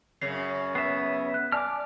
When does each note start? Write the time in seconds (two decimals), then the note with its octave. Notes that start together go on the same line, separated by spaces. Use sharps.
0.22 F#2 C#3 C7
0.75 B3 E5 C7
1.34 F#6
1.52 D5 G#5 A5 D6 F6